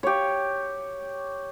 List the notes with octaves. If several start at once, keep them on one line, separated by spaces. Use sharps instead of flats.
G4 C#5